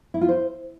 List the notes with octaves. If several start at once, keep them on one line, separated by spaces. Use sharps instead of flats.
E4
F4
C5